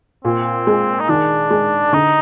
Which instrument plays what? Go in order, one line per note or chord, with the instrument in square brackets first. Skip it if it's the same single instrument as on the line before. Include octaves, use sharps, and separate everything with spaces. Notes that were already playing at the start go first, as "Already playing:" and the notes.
[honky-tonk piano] A#2 [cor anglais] C4
[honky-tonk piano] G#3
[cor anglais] D#4
[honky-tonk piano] D#3 [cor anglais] D4
[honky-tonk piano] G#3
[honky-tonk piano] D3 [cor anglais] D#4